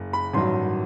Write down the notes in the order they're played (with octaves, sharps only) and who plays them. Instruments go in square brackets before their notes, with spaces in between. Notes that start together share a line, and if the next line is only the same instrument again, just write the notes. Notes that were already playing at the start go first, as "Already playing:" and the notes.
Already playing: [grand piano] F#1
B5
A1 G2 D#3 F#3 C6